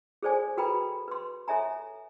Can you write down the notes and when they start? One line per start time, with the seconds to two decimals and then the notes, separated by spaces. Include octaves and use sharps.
0.23 G#4 A4 C5 D5 G#5
0.57 F#4 A4 B4 G5 A#5 B5
1.08 B4 C6
1.48 A4 C#5 E5 G#5 A#5